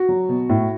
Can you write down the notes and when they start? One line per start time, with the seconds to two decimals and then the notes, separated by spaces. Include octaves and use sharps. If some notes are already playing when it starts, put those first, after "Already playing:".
Already playing: F#4
0.09 F#3
0.29 B2
0.50 A2